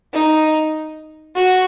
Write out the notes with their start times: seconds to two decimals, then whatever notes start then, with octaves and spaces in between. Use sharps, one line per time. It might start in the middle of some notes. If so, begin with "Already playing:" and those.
0.13 D#4
1.35 F#4